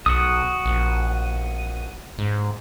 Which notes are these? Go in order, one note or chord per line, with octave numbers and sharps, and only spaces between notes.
B1 F#4 D#6
A#1
G#2